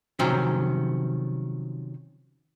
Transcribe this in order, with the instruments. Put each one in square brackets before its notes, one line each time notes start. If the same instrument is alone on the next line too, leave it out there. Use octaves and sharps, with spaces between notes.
[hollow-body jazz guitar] C3 D#3 F3 F#3 C#4 C5